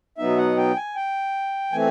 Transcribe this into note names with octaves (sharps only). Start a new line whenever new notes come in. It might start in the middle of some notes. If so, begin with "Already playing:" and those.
B2 F#3 B3 D#4 E5
F#5
G5
G#5
G5
E3 A3 C4 G#5